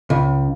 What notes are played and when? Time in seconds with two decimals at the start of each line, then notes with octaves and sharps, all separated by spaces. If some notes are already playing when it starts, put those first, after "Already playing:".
0.10 C#2